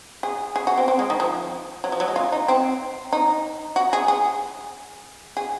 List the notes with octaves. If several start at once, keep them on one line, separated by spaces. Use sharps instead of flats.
G#4
G#4
F#4
C4
C4
G#3
D#3
F3
F#3
F3
F#3
G#3
F4
D#4
C4
D#4
F#4
G#4
G#4
G#4